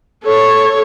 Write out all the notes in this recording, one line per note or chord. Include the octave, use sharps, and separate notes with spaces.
A4 C#5